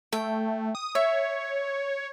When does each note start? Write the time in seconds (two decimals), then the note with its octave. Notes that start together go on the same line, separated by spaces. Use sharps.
0.12 A3 G5
0.75 D#6
0.95 C#5 E5